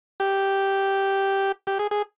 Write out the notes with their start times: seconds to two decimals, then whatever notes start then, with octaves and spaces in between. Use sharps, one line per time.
0.20 G4
1.67 G4
1.79 G#4
1.91 G#4